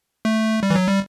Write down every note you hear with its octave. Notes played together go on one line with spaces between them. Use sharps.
A3
G3
E3
F#3
G3